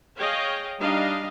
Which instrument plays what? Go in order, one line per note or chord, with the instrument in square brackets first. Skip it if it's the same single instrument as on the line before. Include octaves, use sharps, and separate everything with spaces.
[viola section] G#4 C#5 D#5 F5 G5
G3 D4 D#4 D#5 F5